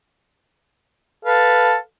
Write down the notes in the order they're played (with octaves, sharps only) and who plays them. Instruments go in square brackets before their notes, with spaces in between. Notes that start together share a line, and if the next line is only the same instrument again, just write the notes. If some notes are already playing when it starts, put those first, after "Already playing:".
[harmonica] A4 B4 F5